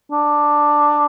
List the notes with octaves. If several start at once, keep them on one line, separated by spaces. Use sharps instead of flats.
D4